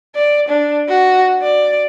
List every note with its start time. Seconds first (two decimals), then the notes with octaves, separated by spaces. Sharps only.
0.15 D5
0.49 D4
0.89 F#4
1.42 D5